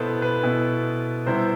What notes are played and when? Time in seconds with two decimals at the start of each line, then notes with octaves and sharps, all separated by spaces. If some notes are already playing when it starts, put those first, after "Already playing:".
Already playing: B2 B3 E4 A4 B4 C5
0.22 B4
0.43 B2 B3 E4
1.26 C3 G3 B3 E4 C5